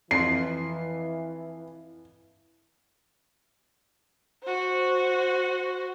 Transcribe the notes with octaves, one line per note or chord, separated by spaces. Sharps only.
F2 E3 C6 C7
F#4 C5